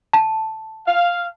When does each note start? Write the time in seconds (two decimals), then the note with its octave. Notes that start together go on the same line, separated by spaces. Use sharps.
0.13 A5
0.87 F5